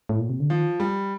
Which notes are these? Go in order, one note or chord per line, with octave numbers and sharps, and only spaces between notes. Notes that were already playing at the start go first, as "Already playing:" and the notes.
A2
A#2
C3
D3
D#3 F3
G3